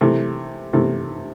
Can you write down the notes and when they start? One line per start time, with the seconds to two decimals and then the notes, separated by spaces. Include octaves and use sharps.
0.01 C3 E3 A3
0.73 C3 E3 A3